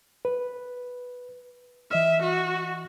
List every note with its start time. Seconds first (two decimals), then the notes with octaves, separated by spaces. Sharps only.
0.25 B4
1.91 E3 D#5 E5 F6
2.22 F#4